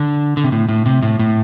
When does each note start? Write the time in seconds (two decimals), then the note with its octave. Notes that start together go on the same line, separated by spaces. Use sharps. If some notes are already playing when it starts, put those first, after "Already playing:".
Already playing: D3
0.37 D3
0.44 C3
0.52 A2
0.69 A2
0.86 C3
1.03 A2
1.19 A2